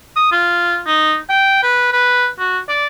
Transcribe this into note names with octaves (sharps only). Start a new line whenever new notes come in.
D#6
F4
D#4
G5
B4
B4
F#4
D5